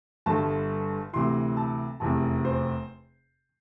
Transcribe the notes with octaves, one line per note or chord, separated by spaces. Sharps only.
G1 G2 D3 A5
D2 C3 E3 C6
A5
F1 E2 C3 A5
C5